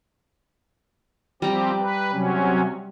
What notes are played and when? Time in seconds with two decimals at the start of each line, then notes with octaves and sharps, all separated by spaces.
1.42 F3 G3 C4 G4 A#5
1.79 B4
2.12 C3 F#3 C#4